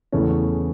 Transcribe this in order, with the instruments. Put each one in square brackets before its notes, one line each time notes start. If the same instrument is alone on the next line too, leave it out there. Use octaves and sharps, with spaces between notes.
[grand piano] E2 C#3 E3 A3 C#4